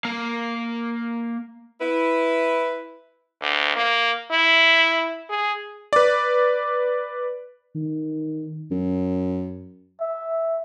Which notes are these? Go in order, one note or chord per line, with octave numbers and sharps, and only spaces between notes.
A#3 F5
E4 B4
D2
A#3
E4
G#4
B4 D5
D#3
F#2
E5